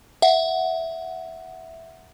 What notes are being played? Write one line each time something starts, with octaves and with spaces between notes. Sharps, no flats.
E5 F#5